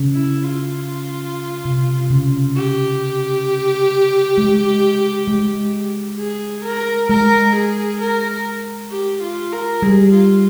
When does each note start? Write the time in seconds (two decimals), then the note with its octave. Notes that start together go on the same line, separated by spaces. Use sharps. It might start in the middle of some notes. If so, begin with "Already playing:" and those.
Already playing: C#3
0.14 E4
0.43 F4
1.65 C3
2.11 C#3
2.55 G4
4.38 G#3
5.27 G#3
6.19 G#4
6.65 A#4
7.10 G#3 A#4
7.56 G#4
8.01 A#4
8.92 G4
9.22 F4
9.52 A#4
9.82 G3 G#4
10.13 F4